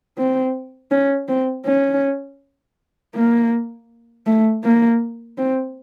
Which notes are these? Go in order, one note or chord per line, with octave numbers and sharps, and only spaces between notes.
C4
C#4
C4
C#4
A#3
A3
A#3
C4